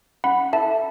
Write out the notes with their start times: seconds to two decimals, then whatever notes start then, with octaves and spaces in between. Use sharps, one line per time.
0.24 C#4 F#5 B5
0.53 E4 A4 E5 A5